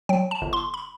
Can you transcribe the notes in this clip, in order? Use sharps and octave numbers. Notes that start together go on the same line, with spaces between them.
F#3 G5
A5
G1
C6
B5